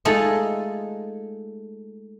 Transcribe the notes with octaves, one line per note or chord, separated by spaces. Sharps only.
G#3 A3 D#4 F4 A4 D#5